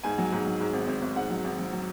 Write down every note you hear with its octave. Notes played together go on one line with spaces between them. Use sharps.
G#2 G#5
F#3
G#2
F#3
G#2
G#1
G#1
G#1
G#2 F#5
F#3
G#1
F#3
F#3